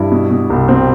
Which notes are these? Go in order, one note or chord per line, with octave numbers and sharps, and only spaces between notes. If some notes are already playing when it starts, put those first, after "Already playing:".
Already playing: G2 E4
B2
B2
C2
B2 C4